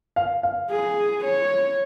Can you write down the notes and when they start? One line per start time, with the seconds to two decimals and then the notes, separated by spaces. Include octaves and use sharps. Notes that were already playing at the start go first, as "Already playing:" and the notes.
0.16 F5
0.43 F5
0.71 G#4
1.25 C#5